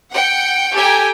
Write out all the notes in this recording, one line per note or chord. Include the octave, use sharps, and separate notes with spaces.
F#5 G5 C#7
G4 A4 G5 G#5 A#5